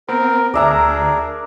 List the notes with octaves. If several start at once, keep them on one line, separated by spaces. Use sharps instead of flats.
B3 C4 A#4
D2 D4 G#4 A#4 D5 E5 A#5